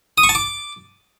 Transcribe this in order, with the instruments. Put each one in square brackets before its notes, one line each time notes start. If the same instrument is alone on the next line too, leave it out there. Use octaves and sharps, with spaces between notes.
[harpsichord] D#6
C#6
A5
D6